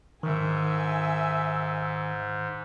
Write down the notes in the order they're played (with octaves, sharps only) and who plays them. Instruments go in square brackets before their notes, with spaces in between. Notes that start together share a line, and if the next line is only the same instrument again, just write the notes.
[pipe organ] G#2 [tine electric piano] D#3 [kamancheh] E5 G#5